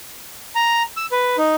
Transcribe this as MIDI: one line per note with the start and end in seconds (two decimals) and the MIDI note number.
0.55 0.83 82
0.97 1.06 88
1.12 1.36 71
1.38 1.56 63